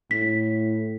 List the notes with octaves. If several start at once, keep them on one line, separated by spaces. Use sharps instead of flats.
A2 B6